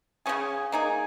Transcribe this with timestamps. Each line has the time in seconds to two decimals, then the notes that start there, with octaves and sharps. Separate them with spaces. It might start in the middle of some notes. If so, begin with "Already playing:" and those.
0.26 C#3 F3 C#4 G#4
0.72 A#3 D#4 G#4